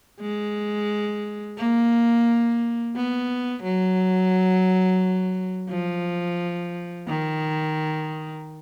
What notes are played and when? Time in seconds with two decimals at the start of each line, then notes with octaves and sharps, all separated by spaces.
0.20 G#3
1.57 A#3
2.95 B3
3.63 F#3
5.69 F3
7.08 D#3